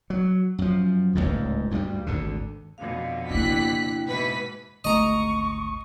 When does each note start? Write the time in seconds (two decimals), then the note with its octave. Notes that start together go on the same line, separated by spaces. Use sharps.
0.10 F#3
0.58 F#2 F3
1.15 D1 G#1 C#2 G#2
1.71 D2 G2 F#3 G3
2.07 G#1 D2 D3
2.78 F2 B2 D3 F5
3.30 C#3 A#3 D4 E4 G5 F#6 B6
4.07 G#2 B2 E3 B4 B6
4.84 G#1 D2 A3 D#5 A#5 C#6